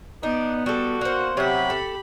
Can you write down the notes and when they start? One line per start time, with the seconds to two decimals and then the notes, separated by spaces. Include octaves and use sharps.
0.23 B3 D4 D#4
0.66 G3 F#4 A4
1.01 A#3 C5 F#5
1.37 C3 F#3 G4 F#5 B5
1.70 A4